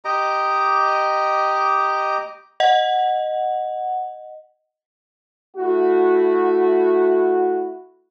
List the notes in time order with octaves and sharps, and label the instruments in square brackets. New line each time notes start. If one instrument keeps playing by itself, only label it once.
[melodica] G4 D#5 A#5 D6
[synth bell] D#5 F#5
[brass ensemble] A3 E4 F#4